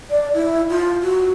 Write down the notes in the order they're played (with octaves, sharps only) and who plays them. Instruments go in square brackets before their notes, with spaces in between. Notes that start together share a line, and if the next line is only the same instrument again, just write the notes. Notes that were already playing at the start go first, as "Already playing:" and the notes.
[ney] D5
E4
F4
F#4